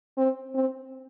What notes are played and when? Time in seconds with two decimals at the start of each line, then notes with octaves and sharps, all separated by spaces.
0.17 C4
0.54 C4